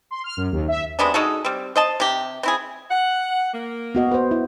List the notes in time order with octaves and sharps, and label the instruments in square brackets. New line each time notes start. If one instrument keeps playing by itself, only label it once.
[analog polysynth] C6
F6
F#2
D#2
E5
[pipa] C3 G#3 B3 D4
G#3 D#4 F#4 A4
G3 C4
C5 D#5 A5
C3 G4
C4 E4 G#4
[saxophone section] F#5
A#3
[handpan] B3 F#4 D#5
B4 C5
E4